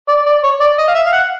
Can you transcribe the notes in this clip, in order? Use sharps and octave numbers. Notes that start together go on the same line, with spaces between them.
D5
D5
C#5
D5
D#5
F5
E5
F5
F#5